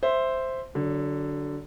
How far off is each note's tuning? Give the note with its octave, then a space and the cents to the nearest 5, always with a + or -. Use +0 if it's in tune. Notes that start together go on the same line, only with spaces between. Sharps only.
C5 +0 E5 +0
D3 +0 F#3 +25